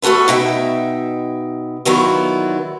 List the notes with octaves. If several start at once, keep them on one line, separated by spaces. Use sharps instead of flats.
A3 C#4 F#4 A4 B4
B2 D#4 E5 G5
A#2 D#3 F#3 B3 E4